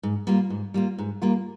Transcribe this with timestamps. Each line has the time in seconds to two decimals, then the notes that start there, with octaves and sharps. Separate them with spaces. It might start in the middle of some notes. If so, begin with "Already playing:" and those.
0.03 G#2
0.27 G3 A#3 F4
0.50 G#2
0.74 G3 A#3 F4
0.98 G#2
1.22 G3 A#3 F4